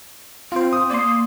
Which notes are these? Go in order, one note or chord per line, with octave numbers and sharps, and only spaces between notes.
C4 F4 C5
D#6
A#3 D5 C6